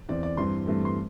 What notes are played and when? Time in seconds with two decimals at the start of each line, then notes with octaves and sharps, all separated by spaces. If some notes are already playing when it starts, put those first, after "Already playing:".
0.09 E2 E3 C4 D5
0.23 D5
0.37 G2 E3 C4 C6
0.66 G2 E3 A3 C4
0.85 C6